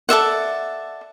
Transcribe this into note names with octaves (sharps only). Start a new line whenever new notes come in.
A4 D5 E5 F#5